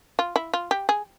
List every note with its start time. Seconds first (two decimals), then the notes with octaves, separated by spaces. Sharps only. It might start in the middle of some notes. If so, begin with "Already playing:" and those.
0.19 F4
0.36 E4
0.53 F4
0.71 G4
0.89 G#4